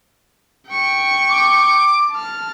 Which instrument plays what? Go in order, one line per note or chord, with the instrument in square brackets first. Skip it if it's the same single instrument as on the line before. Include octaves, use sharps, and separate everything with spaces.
[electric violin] G5 C#6
[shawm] D6
[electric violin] A5 F6